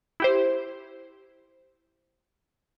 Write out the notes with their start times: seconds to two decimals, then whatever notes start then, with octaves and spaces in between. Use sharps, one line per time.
0.20 E4 G4 C5